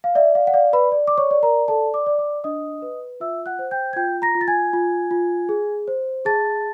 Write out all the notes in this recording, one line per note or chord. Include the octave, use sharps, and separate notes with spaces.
F5
D5 E5
F5
F#5
D5 F5
B4 B5
D5
D6
C#5 C#6
D5
A#4 A#5
A4 D5 A5
D5 D6
D5
D5 D6
D4 D#5 D#6
B4
F4 E5 E6
F#5 F#6
C5
G5 G6
G#6
F4 G5 G6
A#5 A#6
F4
A6
G#5 G#6
F4
F4
G#4
C5
G#4 A5 A6